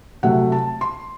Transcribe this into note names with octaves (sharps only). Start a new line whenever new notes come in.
C3 F#3 A3 F#5
A5
C6